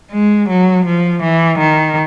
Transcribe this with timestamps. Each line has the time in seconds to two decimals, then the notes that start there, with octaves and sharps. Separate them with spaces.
0.12 G#3
0.49 F#3
0.85 F3
1.22 E3
1.59 D#3